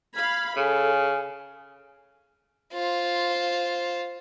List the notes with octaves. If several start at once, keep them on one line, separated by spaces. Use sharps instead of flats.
F5 B5 G#6
C#3 A4 G#5
F4 C5